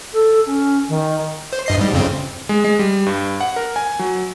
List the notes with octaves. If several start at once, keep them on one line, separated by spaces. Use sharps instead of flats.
A4
C#4
D#3
C5
G2 D#5 C7
G#2 G3
F2 C#3 C4
G#3
G#3
G3
G2
F#5
A#4
G#5
F#3